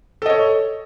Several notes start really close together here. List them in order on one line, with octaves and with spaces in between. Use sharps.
A4 D#5 C#5